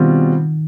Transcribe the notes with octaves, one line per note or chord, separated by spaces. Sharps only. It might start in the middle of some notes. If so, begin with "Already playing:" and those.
Already playing: B2 D#3 G3 C4 F4